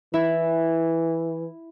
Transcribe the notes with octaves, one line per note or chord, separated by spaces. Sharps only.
E3 E4 E5